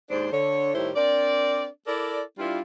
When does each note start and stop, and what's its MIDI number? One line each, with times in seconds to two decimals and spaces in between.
0.10 0.29 39
0.10 0.29 44
0.10 0.29 62
0.10 0.29 72
0.32 0.72 50
0.32 0.72 73
0.74 0.91 45
0.74 0.91 51
0.74 0.91 55
0.74 0.91 64
0.74 0.91 72
0.74 0.91 73
0.96 1.67 60
0.96 1.67 62
0.96 1.67 70
0.96 1.67 74
1.87 2.22 64
1.87 2.22 69
1.87 2.22 70
1.87 2.22 74
2.38 2.60 55
2.38 2.60 62
2.38 2.60 64
2.38 2.60 65